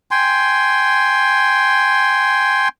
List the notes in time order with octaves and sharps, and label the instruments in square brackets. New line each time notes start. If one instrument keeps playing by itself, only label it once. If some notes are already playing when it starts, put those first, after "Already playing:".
[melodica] G5 G#5 C6